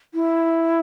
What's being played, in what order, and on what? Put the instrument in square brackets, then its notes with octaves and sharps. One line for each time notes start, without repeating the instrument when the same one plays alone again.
[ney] E4